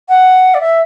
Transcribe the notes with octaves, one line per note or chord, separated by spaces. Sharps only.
F#5
D5
E5